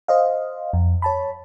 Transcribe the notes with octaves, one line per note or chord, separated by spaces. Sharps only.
C5 D#5 F5
F2
C#5 A5 B5